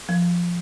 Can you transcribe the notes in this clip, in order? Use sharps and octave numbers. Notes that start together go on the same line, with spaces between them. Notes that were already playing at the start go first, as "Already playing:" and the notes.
F3